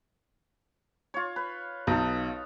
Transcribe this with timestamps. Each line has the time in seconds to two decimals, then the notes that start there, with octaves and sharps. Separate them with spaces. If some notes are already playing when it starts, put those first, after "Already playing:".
1.14 F4 C#5
1.36 B4
1.87 B1 D#4 A4